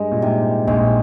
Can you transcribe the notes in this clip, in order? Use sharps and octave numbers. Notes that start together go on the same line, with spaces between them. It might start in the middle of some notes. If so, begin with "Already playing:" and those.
Already playing: G2 G#3
A#2
G#2 C3
A#1 A#2 G#3